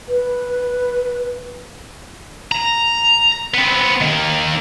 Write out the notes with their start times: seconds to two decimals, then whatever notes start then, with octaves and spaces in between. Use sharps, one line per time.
0.08 B4
2.52 A#5
3.54 B3 C4
4.01 D#3 A#3